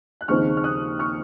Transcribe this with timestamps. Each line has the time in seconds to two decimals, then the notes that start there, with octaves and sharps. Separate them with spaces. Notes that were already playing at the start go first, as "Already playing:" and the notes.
0.21 F#6
0.28 D#2 C#3 F3 C4 D#4 C#6 F6
0.57 F6
0.64 D#6 F#6
0.99 C#6 F6